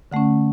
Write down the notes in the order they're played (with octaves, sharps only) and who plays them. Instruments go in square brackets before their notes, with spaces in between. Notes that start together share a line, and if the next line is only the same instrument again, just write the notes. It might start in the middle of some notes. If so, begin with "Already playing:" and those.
[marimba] D3 A3 C#4 F#5